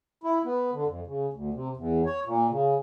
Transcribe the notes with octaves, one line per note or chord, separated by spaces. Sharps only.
E4
B3
D3
F2
C#3
D2
C3
E2
C#5
A#2
C#3